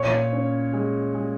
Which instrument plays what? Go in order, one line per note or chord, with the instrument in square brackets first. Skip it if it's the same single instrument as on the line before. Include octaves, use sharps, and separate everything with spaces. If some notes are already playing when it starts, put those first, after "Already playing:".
Already playing: [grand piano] A#2 [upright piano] C#5
[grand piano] C#4
G#3
G#3